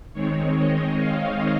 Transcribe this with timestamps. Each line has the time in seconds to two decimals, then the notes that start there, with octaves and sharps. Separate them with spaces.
0.13 D#3 G#3 C4 C#5
0.56 D#5
0.98 F5